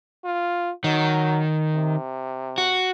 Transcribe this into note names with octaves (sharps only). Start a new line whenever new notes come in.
F4
D#3 F#3
C3
F#4